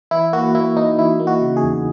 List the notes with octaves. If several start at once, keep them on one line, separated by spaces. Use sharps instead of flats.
E3 E4
A#3 F#4
A#3 E4
A#3 D#4
E3 E4
A#3
F#4
C#3
G#4
E2